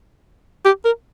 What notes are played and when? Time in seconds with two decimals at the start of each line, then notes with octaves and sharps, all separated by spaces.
0.65 G4
0.85 A#4